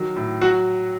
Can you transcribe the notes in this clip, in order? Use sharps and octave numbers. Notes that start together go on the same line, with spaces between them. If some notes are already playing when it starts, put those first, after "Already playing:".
Already playing: D#3 F#3
A2
F#3 F#4 F#5